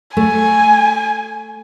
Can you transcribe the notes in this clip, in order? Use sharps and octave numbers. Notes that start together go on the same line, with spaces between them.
A3 G#5